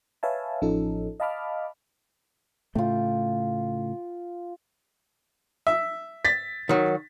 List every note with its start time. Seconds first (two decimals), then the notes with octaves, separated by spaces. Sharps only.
0.23 B4 C#5 E5 F5 G#5 A5
0.61 A1 F3 C#4 D#4 A4
1.20 D#5 F5 A5 B5 D6 F6
2.75 A2 C#3 A3 F4 G5
5.67 E5
6.25 A6 B6
6.69 D#3 F#3